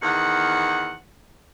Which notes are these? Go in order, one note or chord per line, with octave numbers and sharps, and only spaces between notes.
E2 D#3 F#5